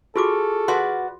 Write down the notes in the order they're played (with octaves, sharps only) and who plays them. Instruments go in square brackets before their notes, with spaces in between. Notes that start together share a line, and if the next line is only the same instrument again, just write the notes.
[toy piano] F4 F#4 D6 [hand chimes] G#4 C#6 F6 [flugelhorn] A4
[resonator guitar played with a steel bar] F#4 B4 D5 [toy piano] C6